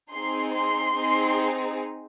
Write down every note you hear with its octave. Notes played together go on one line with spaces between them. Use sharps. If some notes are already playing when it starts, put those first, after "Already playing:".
C4 D#4 G#4 C6
C6
C4 D#4 G#4